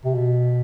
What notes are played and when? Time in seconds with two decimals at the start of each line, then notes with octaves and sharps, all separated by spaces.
0.05 C3
0.15 B2